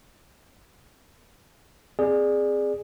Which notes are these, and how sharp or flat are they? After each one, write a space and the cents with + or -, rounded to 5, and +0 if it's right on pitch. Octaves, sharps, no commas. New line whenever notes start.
C4 +0 G#4 +0 D5 +15